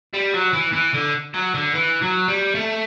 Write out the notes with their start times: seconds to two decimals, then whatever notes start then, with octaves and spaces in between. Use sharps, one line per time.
0.13 G3
0.33 F#3
0.53 E3
0.73 E3
0.94 D3
1.34 F#3
1.54 D3
1.74 E3
2.02 F#3
2.28 G3
2.55 A3